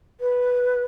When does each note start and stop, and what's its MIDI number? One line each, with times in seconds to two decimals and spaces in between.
0.20 0.83 71